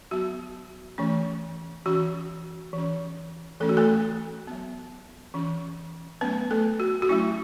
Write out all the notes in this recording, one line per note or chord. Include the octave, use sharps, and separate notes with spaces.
F#3 B3 F#4
E3 A3 C#4
E3 C#4 F#4
E3 C#4
E3 A3 C#4 A4
F#4
A3 A4
F#3 B3
E3 C#4
F#3 A3 B3 C#4 B4
A3 A4
F#4
F#4
F#3 A3 C#4 E4